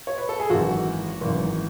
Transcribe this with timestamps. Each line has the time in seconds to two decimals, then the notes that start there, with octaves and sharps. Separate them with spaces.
0.07 C#5
0.18 B4
0.29 A4
0.40 G#4
0.50 G#1 F#2 E3 F#4
1.21 G#1 F#2 E3